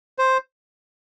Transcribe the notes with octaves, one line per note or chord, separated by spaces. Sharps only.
C5